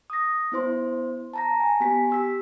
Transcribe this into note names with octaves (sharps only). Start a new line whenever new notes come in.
D#6 A#6
B3 E4 C5 C6
A5 A#5 A#6
G#5
B3 G4 G#5 B6
G4 E6 B6